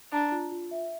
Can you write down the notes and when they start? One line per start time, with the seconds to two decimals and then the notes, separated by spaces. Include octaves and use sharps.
0.12 D4 A#5
0.32 F4
0.52 F4
0.71 E5